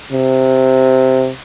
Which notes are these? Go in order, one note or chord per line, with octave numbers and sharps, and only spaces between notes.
C3